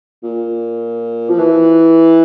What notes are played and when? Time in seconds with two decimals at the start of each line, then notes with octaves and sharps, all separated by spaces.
0.23 A#2
1.30 F3
1.39 E3